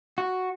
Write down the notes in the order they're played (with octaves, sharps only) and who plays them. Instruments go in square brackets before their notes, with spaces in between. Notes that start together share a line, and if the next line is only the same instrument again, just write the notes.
[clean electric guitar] F#4